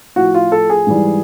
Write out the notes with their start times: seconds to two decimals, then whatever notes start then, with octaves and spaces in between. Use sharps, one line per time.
0.16 A2 F3 F#4
0.34 F4
0.52 A4
0.70 G#4
0.87 G#2 E3 G3